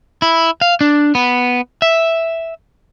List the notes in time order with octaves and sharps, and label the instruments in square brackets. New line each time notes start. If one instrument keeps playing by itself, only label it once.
[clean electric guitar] E4
F5
D4
B3
E5